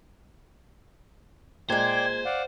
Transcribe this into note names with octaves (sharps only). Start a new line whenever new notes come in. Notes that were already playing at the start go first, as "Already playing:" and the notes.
A#2 G#3 C5 D5 G5 G#6
D5 F5 F#5